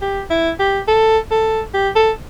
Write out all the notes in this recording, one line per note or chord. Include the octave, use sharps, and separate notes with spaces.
G4
E4
G4
A4
A4
G4
A4